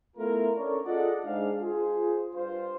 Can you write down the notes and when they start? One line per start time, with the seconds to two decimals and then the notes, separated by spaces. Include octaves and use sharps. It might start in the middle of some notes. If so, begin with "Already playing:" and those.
0.17 A3 B3 E4 F4 A#4
0.56 C#4 D4 A4 A#4 C#5 D5
0.85 F4 G#4 A4 D5 D#5 F#5
1.25 G#2 D4 F5
1.61 F4 G#4 C5
2.33 G2 F4 C5